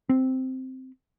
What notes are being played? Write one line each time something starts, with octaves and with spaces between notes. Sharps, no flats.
C4